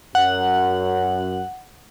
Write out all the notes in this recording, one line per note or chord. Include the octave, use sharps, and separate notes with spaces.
F#2 F#5